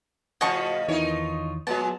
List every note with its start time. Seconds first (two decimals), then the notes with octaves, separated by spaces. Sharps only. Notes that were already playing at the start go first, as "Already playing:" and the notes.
0.41 A2 C#3 F3 F#4 D#5 A5 C#6
0.88 E2 D#3 E3 D#4 F4 C#5
1.67 A#2 F#3 G#3 B3 A5